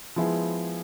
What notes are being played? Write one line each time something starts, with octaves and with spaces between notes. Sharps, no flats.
F3 G#3 B3 E4 G#4